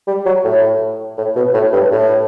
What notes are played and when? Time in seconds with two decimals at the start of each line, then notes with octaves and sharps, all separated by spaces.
0.07 G3
0.26 F#3
0.44 A2
1.18 A2
1.36 B2
1.54 A2
1.73 G2
1.92 A2